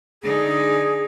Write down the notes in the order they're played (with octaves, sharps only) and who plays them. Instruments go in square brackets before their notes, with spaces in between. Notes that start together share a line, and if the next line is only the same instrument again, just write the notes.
[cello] D3 D#4 [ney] G#4